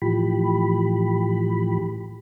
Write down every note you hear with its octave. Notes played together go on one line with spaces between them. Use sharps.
A2 E3 F3 G4 B5